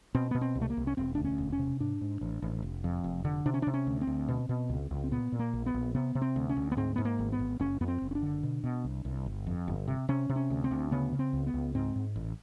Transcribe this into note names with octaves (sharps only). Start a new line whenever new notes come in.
B2 C4
B2 B3
C4
C2
A3
A#3
C2
C#4
E1 C4
D2 D4
C#4
E1
C#4
C3
G#2 D4
G#2
A1
A1
F1
F2
F1
D3
C3 D4
C#4
C3 D4
C#4
D2
C4
D2
B2
B2
C#2
C#2
C4
A#2 B3
A#2
A#3
A#1
B3
A#1
C3 B3
C3
C4
D2
C#4
D2
B3
G#2 C4
G#2 B3
A#3
G#1
B3
G#1
F#1 C#4
F2 B3
C4
F#1
C#4
D4
D3
B2
B2
C2
C2
G1
F2
G1
C3
C3 C#4
C3
C#4
D2
C4
D2
C#3 B3
C#3
C4
C#2
B3
C#2
G#2 C4
G#2
A1